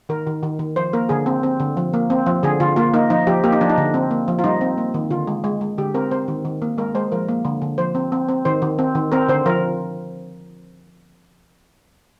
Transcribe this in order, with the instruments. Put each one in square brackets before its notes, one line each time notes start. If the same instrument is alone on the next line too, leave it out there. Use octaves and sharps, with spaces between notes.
[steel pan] D#3 A#4
D#3
D#3
D#3
F3 C5
A#3 A#4
D3 G#4
C4
C4
D3
F3
A#3
C4
F3
D3 G#4
D3 F4
A#3 F4
A#3 D#4
F3 D#4
F3 G4
A#3 G4
D#4
F3 D4
D#4
D3
C4
A#3
F3
F4
G3 D#4
C4
A#3
D#3
D3 F4
G#3
G#3
G#3
D3 G4
C4 A#4
C4 C5
D#3
D#3
A#3
G#3 A#4
G#3 C5
F3 A#4
A#3
D3
D3
F3 C5
C4
C4
C4
D#3 C5
D#3
C4
D#3
C4 A#4
D3 C5
F3 A#4